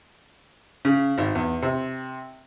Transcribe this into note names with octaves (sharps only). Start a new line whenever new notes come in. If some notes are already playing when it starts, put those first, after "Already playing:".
C#3
G#1
E2
C3